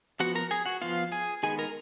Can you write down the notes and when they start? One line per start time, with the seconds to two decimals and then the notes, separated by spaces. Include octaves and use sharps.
0.20 F3 B3 F#4 F#5
0.35 A#4 A#5
0.51 G#4 G#5
0.66 F#4 F#5
0.82 F3 B3 F4 F5
1.12 G#4 G#5
1.43 D#3 G#3 B3 G#4 G#5
1.59 A#4 A#5